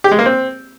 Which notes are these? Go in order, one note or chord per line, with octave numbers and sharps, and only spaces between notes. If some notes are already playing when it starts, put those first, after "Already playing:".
G4
G#3
A#3
C4